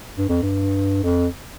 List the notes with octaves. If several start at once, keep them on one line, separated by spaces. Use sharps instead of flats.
G2
F2
G2
F2